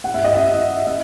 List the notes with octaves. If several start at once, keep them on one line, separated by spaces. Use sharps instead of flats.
F#5
E5
D#5
E5
E5